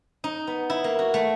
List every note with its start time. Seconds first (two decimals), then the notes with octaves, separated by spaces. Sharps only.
0.24 D#4
0.47 B3
0.70 E4
0.84 A#3
0.99 F#4
1.14 A3